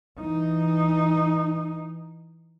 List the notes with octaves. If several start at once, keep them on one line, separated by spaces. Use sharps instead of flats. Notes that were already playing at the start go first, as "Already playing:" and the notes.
E3 D#4